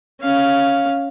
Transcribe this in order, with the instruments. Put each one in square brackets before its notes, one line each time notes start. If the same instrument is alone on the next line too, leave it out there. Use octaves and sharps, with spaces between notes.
[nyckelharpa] C#4 F5